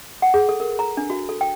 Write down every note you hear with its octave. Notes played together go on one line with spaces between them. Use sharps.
F#5
G#4
A4
A#4
A#5
D4
F#4
A4
G5